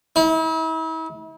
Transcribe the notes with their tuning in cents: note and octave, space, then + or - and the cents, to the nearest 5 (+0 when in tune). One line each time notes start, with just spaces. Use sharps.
E4 -40